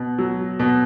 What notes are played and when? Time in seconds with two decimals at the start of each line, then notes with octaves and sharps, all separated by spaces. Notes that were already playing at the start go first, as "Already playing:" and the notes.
Already playing: B2
0.18 F#3
0.60 B2